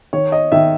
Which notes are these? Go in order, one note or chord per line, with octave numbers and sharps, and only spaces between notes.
D#3 C#5
D#5
D#3 E5